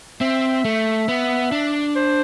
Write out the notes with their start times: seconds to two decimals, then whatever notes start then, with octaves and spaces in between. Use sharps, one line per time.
0.21 C4 E5
0.65 A3
1.09 B3
1.52 D4
1.96 C5